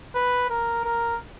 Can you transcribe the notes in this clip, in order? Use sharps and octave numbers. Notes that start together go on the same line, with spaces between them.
B4
A#4
A#4